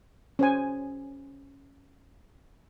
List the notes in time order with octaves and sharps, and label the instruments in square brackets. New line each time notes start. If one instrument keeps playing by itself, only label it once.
[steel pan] C#4 C5 G#5